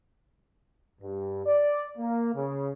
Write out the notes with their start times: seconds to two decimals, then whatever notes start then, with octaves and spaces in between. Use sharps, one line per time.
1.01 G2
1.46 D5
1.98 A#3
2.34 C#3